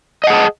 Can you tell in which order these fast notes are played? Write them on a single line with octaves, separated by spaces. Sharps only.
D#5 F#5 G#4 A5